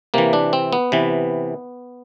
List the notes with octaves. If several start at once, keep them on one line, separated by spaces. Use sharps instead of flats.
C3 E3 A#3
D4
C4
B3
C3 E3